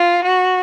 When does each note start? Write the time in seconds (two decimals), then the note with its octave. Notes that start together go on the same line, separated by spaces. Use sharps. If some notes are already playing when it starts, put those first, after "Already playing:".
Already playing: F4
0.24 F#4